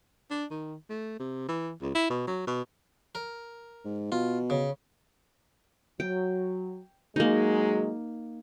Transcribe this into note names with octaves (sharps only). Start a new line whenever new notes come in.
D4
D#3
A3
C3
E3
C#2
E4
B2
F#3
B2
A#4
G#2
B2 F4
C#3
F#3 G5
F#3 G#3 A#3 D#4